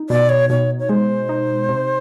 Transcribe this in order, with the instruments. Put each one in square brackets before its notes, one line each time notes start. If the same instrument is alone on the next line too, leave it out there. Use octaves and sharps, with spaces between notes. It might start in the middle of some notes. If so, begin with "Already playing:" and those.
Already playing: [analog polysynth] D#4
[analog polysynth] B2 [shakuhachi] D5
[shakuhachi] C#5
[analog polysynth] B2 [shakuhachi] C#5
[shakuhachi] C#5
[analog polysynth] G#3 [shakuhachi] C5
[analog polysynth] D#4
C3